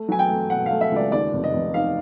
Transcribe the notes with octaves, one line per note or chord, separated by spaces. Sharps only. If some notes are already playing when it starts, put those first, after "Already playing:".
Already playing: A3
F#3 G#5
G5
A3
B2 F#5
F5
A3
E5
C#2 D5
D#2 D5
F1
D#5
F1
D#3 F5